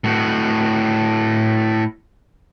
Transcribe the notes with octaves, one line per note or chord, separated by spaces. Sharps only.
A2 F#4